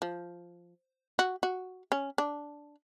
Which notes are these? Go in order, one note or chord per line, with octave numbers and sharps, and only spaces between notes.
F3
F#4
F#4
C#4
D4